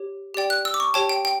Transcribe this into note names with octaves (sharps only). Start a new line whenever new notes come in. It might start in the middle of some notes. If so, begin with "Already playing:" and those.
Already playing: G4 C#5
G4 D5 G5
F#6
E6
D6
C#6
G4 C#5 G5 A5
G5
G5